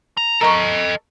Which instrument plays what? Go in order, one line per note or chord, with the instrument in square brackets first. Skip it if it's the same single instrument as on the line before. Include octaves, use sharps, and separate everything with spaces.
[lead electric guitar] A#5
[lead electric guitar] A4 D#5 [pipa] A#4 C#6